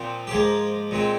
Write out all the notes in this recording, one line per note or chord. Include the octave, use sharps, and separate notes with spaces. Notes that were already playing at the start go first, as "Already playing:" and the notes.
Already playing: A#2 F3 C4
G4
G#2 F3 A#3 G#4
A#2 G#3 C4